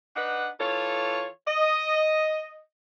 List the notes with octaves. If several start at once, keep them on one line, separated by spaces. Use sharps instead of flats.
D4 D#4 B4 F#5
E3 F4 A4 C#5
D#5